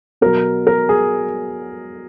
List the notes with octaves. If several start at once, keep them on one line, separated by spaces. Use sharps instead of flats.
B2 F#3 A#4
A#4
G#4